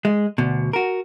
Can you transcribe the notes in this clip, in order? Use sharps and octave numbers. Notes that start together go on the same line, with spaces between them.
G#3
D2 B2
F#4 A#4